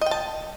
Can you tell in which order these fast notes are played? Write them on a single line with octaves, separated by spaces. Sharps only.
D#5 G5 A5